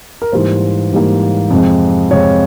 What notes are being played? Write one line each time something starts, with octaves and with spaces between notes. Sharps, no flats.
A#4
G#2 E3 G3 A#3 C5
G#2 E3 G3 A#3
F2 C3 F3 G#3
F2 C3 F3 G#3 C#5